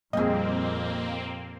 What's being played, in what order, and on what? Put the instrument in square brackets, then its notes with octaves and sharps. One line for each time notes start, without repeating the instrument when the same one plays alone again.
[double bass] F2 A#2 [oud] G3 G#4 [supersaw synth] A#3 C4 [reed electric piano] D#5